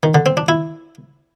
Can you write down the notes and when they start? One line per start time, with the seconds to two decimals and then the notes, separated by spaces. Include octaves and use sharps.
0.03 D#3
0.15 D3
0.26 C4
0.37 D4
0.48 E4